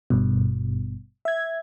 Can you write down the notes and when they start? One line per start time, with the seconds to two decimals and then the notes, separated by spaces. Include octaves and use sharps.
0.10 G#1 G2 B2
1.25 E5 G#6